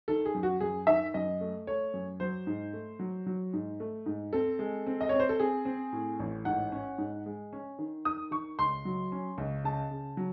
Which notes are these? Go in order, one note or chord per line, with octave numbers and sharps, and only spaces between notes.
D#3 A4
G#4
F#2
F#4
F#2 G#4
D#3 E5
F#2 D#5
A3
A3 C#5
F#2
F#3 C5
G#2
A3
F#3
F#3
G#2
A3
G#2
C4 A4
G#3
C4
D#5
C4 C#5
C5
A4
C4 G#4
C4
A2
A1
G#2 F#5
C#4
G#2
G#3
C#4
D#3
D#3 D#6
D#3 C#6
C#2 C6
F#3
C#4
C#2
C#3 A5
C#3
F#3